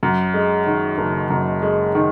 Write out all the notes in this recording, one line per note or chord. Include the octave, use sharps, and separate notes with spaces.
F#2
G#3
D#3
F#1
F#2
G#3
D#3